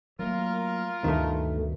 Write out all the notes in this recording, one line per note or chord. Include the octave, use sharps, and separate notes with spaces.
F#3 A3 A#3 F4 A#4
D2 G2 B2 D#3 A3